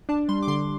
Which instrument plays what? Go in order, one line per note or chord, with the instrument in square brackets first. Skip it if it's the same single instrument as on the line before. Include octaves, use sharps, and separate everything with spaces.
[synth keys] D4 A5
G3 C6
D6
D3 C6